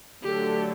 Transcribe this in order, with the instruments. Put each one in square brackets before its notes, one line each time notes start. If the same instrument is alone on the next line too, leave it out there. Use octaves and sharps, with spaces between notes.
[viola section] D3 F#3 A3 D4 A4 [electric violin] G4